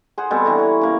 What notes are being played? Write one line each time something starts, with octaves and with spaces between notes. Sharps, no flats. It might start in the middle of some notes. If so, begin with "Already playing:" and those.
G#4 C5 F#5
B2 G3 C4 A4
D3 E3 A#5 C#6
C#5
C#3 A#3